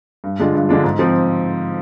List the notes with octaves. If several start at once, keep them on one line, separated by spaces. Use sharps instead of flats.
G2
D3 G#3 D4 F4
G2
D3 G#3 D4 F4
G#2
F3 C4